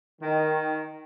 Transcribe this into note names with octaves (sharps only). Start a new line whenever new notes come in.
D#3